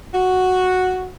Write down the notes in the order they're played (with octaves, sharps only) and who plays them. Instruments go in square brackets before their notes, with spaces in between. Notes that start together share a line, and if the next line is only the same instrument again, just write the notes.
[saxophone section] F#4